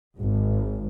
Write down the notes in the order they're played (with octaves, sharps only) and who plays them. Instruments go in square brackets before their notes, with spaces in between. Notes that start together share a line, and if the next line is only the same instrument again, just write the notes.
[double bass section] G#1